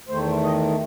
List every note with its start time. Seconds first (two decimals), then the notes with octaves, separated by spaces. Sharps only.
0.09 E2 D#3 A3 C5
0.43 D#5